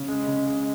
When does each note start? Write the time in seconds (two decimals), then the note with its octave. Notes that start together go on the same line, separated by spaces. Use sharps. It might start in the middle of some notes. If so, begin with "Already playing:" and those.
Already playing: C#3
0.08 G#3
0.28 C#3
0.47 G#3